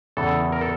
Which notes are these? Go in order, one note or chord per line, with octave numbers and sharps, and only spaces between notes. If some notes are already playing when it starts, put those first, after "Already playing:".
E2 C#3 E3 A4
A#4
A4